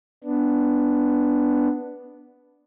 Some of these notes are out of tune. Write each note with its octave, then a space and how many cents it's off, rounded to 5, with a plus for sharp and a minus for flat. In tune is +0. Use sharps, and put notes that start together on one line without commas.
B3 +0 D4 +0